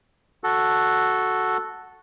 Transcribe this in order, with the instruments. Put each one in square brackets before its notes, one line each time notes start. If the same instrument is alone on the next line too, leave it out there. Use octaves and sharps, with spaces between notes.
[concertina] F#4 A4